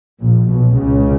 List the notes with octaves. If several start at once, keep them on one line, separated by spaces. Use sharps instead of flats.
A#1 A#2
B1 B2
C#2 C#3